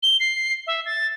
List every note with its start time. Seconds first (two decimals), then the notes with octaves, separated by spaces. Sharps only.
0.03 G7
0.20 C7
0.67 E5
0.86 A6